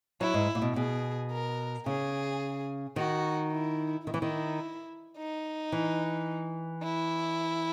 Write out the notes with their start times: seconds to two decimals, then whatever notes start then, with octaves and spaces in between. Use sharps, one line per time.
0.21 F#3 E4
0.34 G#2
0.55 A#2
0.62 B2
0.76 B2 G#4
1.31 A#4
1.86 C#3 G#4
2.96 D#3 F#4
3.52 E4
4.07 D#3 E4
4.14 E3
4.22 D#3
5.17 D#4
5.72 E3
6.82 E4